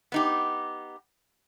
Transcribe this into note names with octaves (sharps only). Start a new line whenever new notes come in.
B3 D#4 G4